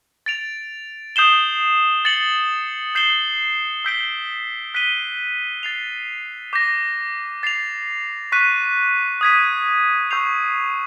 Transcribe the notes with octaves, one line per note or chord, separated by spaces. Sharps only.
A6 D7 F7
D#6 G6 C7 E7 G7
A6 C#7 F#7
G6 C7 E7 G7
E6 G6 B6 D7 G7
F#6 B6 D#7 G7
A6 C7 F7
D6 G6 A#6
A6 C7 F7
C#6 F#6 B6 D#7
D#6 G#6 B6 D#7
C#6 E6 G6 C7 F7